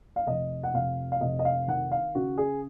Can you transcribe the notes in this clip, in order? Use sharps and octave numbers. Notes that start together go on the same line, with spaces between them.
F5
F1 D#5
F#5
F1 F5
F5
F1 D#5
D#5
F5
D#3 F#5
F5
C#3 F#4
G#4